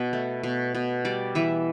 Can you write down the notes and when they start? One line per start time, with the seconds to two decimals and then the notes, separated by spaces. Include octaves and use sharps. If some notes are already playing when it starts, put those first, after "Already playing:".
Already playing: B2 B4
0.13 A3
0.43 B2
0.75 B2
1.05 G3 D5
1.35 E3 E5